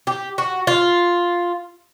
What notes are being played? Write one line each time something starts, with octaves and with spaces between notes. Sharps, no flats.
G4
F#4
F4